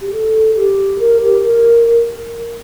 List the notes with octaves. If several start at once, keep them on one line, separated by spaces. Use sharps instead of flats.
G4
A4
G4
A#4
G4
A#4